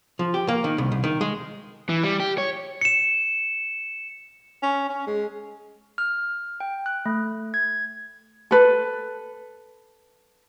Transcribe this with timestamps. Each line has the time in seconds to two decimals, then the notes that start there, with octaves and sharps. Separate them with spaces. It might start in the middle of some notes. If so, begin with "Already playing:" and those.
0.19 F3
0.34 G4
0.48 A#3
0.64 D#3
0.78 C2
0.92 C2
1.04 D#3
1.21 G#3
1.89 E3
2.04 G3
2.20 G4
2.38 C#5
2.81 C#7 E7
4.62 C#4
4.89 C#4
5.07 G#3
5.98 F6
6.60 G5
6.86 F#6
7.06 A3
7.54 G#6
8.51 A4 B4